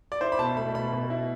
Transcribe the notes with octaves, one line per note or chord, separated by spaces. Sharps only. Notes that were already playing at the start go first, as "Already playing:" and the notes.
D5
E4 C5
B5
B2 A5
A3 B5
B2 B5
B2
E4